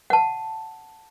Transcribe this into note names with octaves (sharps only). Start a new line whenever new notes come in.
F#5 A5